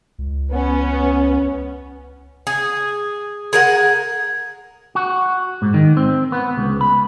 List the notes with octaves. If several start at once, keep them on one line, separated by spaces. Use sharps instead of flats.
C#2
B3 C#4
G#4
G#4 A#4 F#5
F#4
G#2
D#3
C4
B3
C#2
B5